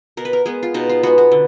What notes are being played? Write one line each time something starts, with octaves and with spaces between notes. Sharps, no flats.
B2 A#4
B4
A#4
G#3 B3 G#4
F4
B2 D#4
F4
G#3 B3 F#4
F#4
D3